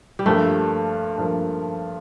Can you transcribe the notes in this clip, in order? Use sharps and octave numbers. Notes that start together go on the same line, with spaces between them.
G3
G2 F3 A3 A#3
G2 F3 A#3